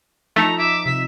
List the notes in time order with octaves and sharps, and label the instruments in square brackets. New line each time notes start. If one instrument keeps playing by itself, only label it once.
[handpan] F3 D#4 [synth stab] A3 [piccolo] A#5
[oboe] E5 [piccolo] D6
[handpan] C3 [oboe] E5 [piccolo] B6